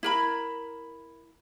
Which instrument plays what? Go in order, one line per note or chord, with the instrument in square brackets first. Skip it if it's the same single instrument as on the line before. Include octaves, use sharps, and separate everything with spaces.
[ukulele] E4 A#4 B5